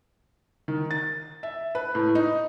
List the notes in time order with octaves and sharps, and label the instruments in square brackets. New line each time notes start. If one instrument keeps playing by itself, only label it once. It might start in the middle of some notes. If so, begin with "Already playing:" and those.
[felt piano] D#3
A6
E5
B4
A2
D#4